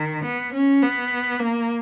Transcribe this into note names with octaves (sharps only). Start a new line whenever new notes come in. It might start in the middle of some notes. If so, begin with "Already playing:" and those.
Already playing: D#3
B3
C#4
B3
A#3